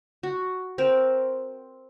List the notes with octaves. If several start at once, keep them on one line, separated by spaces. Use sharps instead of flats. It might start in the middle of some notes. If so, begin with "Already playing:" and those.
F#4
C4 A#4